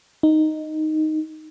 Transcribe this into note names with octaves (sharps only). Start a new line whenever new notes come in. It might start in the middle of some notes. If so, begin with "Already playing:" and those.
D#4